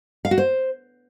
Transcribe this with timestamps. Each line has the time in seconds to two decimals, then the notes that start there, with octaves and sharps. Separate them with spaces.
0.25 F5
0.31 F#4
0.38 C5